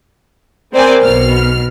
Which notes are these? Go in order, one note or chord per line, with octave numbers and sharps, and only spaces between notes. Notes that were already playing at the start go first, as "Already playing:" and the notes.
C4 A#4 C5 D5 G#5
B1 B2 F6